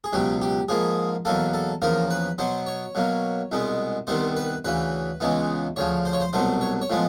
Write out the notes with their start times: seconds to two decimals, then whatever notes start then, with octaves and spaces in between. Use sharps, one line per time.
0.04 G#4
0.13 C#2 B2 F#3 G4
0.41 G4
0.69 G#2 F3 A#3 G#4
1.25 E2 B2 F#3 A#3 A4
1.54 A4
1.82 E2 C#3 F3 A#3 A#4
2.10 B4
2.38 B2 F#3 B3 C5
2.67 C#5
2.95 B2 F#3 A#3
3.52 C2 B2 G#3 B3
4.07 C2 C3 D#3 G3 B3 C5
4.37 B4
4.65 D2 C#3 E3 B4
5.20 C#2 C#3 E3 G#3 B3
5.76 D2 C#3 F3 C#5
6.05 C5
6.13 C#5
6.20 C5
6.33 C2 B2 F#3 A3 C5
6.61 C#5
6.82 C#5
6.90 A2 F3 G#3 B3